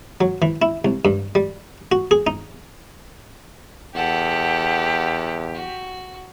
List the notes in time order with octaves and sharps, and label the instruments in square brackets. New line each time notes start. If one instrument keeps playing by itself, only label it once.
[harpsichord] F#3
E3
E4
C2
G2
G3
F#4
G#4
D#4
[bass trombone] E2 [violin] G4 [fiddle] A4 F#5
[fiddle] F#4